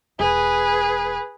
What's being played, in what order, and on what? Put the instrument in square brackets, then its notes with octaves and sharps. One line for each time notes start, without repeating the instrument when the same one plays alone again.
[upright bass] E1 [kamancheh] G#4 B4